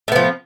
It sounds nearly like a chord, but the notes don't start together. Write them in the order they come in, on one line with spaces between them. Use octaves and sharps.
A2 B3 F3